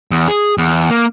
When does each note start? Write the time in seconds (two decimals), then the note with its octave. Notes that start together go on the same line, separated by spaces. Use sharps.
0.11 E2
0.28 G#4
0.58 E2
0.90 A#3